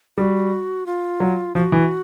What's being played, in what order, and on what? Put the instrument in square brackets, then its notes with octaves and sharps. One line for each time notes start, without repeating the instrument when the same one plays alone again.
[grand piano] G3 [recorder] F#4
[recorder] F4
[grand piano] F#3
[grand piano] F3 [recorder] F#4
[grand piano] E3